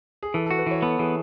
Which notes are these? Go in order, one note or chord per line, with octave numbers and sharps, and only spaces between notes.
G#4
E3 A4
A4
F#4
B4
E3 C#5
B3 A4
E3 G#4